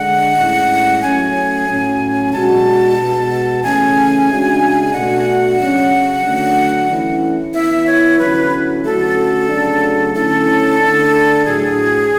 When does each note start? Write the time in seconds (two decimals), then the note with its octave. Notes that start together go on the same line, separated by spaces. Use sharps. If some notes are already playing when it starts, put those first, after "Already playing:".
Already playing: D3 G#3 D4 F#5
0.37 A2 G#3 C#4 E4
1.02 F#3 A3 C#4 G#5
1.68 A2 F#3 C#4
2.33 B2 G#3 D4 F#4 A5
2.97 B2 G#3 B3 F#4
3.63 C#3 E3 A3 C#4 G#5
4.28 C#3 G#3 D4 F#4
4.93 B2 A3 D4 F#4 F#5
5.58 C#3 F#3 C#4
6.23 D3 F#3 A3 D4 F#4
6.89 E3 A3 C#4 E4
7.54 E3 B3 E4 E5
7.87 C#5
8.19 D3 F#3 C#4 E4 B4
8.84 D3 A3 C#4 F#4 A4
9.49 C#3 F#3 A3 D4
10.14 D3 A3 C#4 E4 A4
10.79 D3 A3 D4
11.45 A2 F#3 A3 D4 F#4 G#4